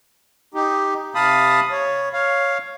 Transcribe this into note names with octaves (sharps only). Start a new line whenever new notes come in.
D#4 G4
C3 F5 A5 B5 D#6
C#5
C#5 F5